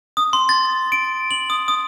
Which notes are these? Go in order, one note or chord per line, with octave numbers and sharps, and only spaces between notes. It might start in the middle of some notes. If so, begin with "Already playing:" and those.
D#6
C6
A6
D7
F#7
D#6
D#6